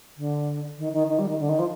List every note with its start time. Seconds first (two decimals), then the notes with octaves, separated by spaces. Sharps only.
0.17 D3
0.78 D#3
0.93 D#3
1.08 D#3
1.19 G3
1.28 D#3
1.39 D3
1.49 D#3
1.59 F3